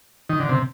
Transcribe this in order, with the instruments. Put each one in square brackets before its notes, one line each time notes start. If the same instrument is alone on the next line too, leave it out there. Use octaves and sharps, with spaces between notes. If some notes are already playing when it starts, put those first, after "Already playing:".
[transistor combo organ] D#3
D3
C3